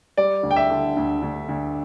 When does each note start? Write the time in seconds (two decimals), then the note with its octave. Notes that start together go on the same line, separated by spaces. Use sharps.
0.17 G3 D5
0.43 D2
0.51 G5
0.56 E5
0.70 D3
0.97 D2
1.22 D2
1.49 D2